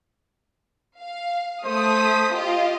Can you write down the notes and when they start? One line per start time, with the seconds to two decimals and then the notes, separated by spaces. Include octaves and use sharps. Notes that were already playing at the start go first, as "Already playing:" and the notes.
0.99 F5
1.65 A3 C5 D#6 B6
2.34 F4 G4 D#5